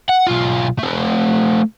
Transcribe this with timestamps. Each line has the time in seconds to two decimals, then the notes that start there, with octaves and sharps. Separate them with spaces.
0.09 F#5
0.27 B1 F4
0.79 A3 C4